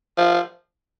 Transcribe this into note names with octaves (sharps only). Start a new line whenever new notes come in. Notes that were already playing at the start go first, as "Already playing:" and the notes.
F3